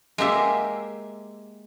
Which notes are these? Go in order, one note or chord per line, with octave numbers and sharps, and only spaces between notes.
G#3 A#3 G4 E5